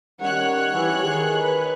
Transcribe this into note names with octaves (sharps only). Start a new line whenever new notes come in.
D#3 G3 C#4 C#5 F#5 F#6
E3 G4
D#3 G#4
B4